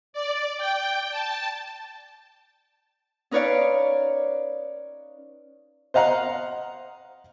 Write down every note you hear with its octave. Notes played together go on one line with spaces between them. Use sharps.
D5
G5
A5
C#4 D#4 B4 C#5 D5 F5
C5 D#5 F5 F#5 A#5